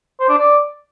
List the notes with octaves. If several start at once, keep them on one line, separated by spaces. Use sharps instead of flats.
C5
D4
D5